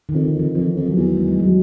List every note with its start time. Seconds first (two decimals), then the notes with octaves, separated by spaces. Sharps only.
0.09 F2 D#3
0.24 D3
0.34 F2 E3
0.54 F2 F3
0.76 F2
0.86 F#3
0.96 E2
1.17 G#3
1.28 G3
1.40 F#3